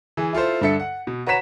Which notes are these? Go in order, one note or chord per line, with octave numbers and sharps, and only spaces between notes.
E3 G#4
E4 F4 A4 C5
G2 D3 A4 E5 C#7
F#5
B2
F#4 B4 C#5 A#5 B6 E7